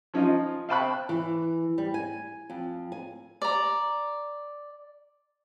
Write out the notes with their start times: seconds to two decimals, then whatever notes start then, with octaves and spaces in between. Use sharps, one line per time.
0.14 F3 C#4 D#4 F4
0.69 F5 G5 A5 B5 C#6 F#6
1.09 E3
1.78 G3
1.94 G#5
2.50 F2
2.92 G#5
3.42 D5 A#5